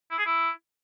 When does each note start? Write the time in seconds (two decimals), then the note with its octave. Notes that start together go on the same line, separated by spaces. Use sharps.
0.11 E4
0.18 G#4
0.26 E4